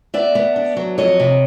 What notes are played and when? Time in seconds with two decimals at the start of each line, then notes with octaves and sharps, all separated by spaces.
0.14 B3 D5 E5
0.35 B3
0.56 D4
0.77 F#3
0.98 F2 C#5 D#5
1.20 C3